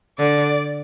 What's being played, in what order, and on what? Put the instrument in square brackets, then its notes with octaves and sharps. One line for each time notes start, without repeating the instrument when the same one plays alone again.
[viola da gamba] D3 [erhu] D5